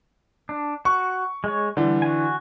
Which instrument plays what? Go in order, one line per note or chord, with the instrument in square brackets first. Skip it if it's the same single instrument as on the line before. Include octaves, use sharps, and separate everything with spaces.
[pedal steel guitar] D4
[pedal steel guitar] F#4 [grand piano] C#6
[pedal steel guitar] G#3 C#5
[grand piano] D3 E3 [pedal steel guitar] G3
[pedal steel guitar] F#4 G#5